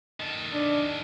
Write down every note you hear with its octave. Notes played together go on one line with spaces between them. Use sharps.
D#3 A4
D4